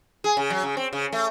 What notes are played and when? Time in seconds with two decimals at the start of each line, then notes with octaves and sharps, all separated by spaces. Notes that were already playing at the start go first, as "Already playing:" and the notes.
0.24 G#4
0.37 C#3
0.50 F#3
0.63 C#3
0.77 C4
0.93 C#3
1.12 A3